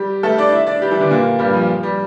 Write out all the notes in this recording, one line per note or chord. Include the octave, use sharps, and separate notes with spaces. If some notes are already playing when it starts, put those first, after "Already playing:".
Already playing: G3 G4
A3 A4
D4 D5
E4 E5
D4 D5
G3 G4
E3 E4
D3 D4
A#2 A#3
G2 G3
F3
G3